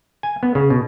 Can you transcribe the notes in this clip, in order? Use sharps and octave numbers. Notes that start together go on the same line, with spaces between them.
G#5
B3
C#3
B2